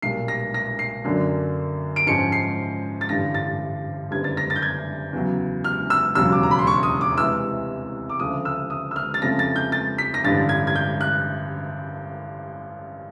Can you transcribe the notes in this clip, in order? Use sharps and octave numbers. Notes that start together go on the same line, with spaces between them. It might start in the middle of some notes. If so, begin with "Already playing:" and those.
B1 A#2 G3 A#3 C7
A#6
A#6
C7
F#2 D3 F#3 A#3 D4
D7
G#2 F3 G#3 C#4 C#7
C7
A6
A1 G2 D3 A#6
A6
F#1 F#2 D3 G3 B3 G#6
A6
A#6
A6
G6
G#6
E2 C#3 F#3
F6
E6
E1 D#2 C#3 F#3 E6
D6
A#5
B5
C6
C#6
D#6
D6
C2 C3 E3 G#3 E6
D6
D2 C#3 F3 A3 D#6
E6
D#6
E6
F6
A6
F2 C#3 F3 A3 C#4 A#6
A6
G6
A6
B6
A#6
A1 G2 D3 G3 A6
G#6
G#6
G6
F#6